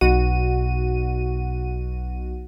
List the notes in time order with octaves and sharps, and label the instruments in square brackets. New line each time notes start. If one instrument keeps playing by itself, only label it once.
[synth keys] B1 F#4 D#7